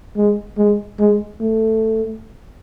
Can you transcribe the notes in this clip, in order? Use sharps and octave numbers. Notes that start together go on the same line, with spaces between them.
G#3
G#3
G#3
A3